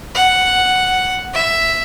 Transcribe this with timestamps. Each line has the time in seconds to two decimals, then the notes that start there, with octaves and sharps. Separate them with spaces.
0.15 F#5
1.34 E5